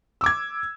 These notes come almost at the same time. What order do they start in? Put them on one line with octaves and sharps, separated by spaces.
E6 D6 G#6